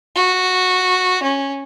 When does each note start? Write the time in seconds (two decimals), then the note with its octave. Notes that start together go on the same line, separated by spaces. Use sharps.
0.15 F#4
1.23 C#4